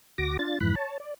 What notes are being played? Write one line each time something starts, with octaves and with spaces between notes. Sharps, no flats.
D2 F#4 D6 A#6
D4 F4 A6
F2 G#2 E3 B5 F#6
C#5 A5
D5